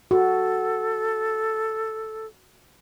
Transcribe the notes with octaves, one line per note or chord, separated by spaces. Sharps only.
F#4 A4